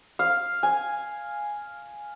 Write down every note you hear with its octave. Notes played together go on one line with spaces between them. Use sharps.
F5
G#5